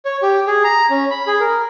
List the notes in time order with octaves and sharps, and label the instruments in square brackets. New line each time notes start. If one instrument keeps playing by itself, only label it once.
[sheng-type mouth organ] C#5
G4
G#4
A#5
C#4
B5
G#4
A#4